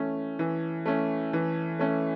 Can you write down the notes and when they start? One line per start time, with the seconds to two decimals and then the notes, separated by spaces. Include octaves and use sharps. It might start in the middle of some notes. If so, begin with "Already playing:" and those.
Already playing: E3 A3 C#4
0.39 E3
0.86 A3 C#4
1.33 E3
1.79 A3 C#4